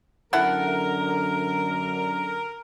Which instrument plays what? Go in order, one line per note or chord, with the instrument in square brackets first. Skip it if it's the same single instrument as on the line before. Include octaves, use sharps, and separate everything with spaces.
[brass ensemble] F#2 D3 [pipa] E4 A4 F#5 [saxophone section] A#4